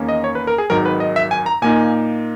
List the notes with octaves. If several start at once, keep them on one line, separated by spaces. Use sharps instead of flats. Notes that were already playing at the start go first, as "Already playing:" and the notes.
Already playing: E2 D#3 A#3 C#4
D#5
C#5
B4
A#4
G#4
G#1 G#2 D#3 F#3 A#4
B4
D#5
E5
G#5
A#5
A#2 A#3 D#4 G#5